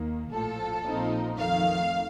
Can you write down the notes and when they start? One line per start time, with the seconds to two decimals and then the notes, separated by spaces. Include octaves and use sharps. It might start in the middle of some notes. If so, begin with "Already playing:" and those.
Already playing: D#2 D#3 A#3
0.33 A#1 A2 F3 A4
0.85 A#1 A#2 F3 C4 D#4
1.38 F2 D#3 A3 F5